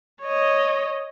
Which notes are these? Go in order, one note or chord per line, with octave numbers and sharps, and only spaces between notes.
C#5 D#5